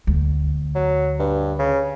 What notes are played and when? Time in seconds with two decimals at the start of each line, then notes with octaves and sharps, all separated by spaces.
0.07 D2
0.75 F#3
1.19 G2
1.59 C#3